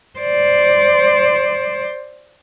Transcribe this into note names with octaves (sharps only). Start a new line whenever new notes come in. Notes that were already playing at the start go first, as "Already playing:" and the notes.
C5 D5